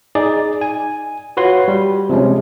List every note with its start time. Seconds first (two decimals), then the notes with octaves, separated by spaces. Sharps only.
0.15 D#4 G#4 D5
0.61 G#5
1.37 F4 F#4 B4 C#5 C6
1.68 G3
2.09 C3 F3 G#3 C#4